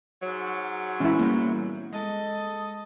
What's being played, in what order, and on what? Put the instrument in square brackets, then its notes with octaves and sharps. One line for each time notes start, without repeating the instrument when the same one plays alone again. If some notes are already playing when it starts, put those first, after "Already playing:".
[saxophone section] G#2 F#3 [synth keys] C#5
[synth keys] A#2 E3 G#3 [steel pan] C#4 E4
[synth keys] G3 A#3 B3
[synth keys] G#3 [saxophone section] A4 D#5